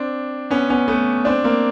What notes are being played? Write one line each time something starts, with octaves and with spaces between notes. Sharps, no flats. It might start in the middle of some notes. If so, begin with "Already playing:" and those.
Already playing: C4 D4
B3 C#4
B3 C#4
A3 B3
C4 D4
A#3 C4